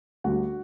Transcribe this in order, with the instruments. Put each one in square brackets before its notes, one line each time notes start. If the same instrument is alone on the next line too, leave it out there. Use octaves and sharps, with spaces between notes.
[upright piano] D2 D3 G3 F#4 F#5